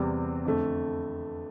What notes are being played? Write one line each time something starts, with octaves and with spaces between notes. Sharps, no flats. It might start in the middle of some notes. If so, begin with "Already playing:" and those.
Already playing: E2 C3 G3 C4
F2 D3 A3